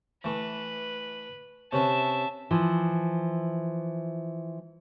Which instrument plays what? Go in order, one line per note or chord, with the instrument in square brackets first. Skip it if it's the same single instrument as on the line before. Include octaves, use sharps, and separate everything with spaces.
[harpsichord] E3 A3 [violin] B4
[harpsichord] C3 C#4 B4 [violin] E5 A5
[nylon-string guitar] E3 F3